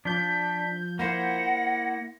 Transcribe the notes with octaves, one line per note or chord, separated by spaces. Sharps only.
F3 D4 G6 B6
A#3 E4 C5 F#5 A#6